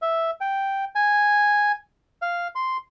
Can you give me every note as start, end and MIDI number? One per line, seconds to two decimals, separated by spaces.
0.02 0.31 76
0.41 0.85 79
0.95 1.72 80
2.22 2.48 77
2.55 2.77 84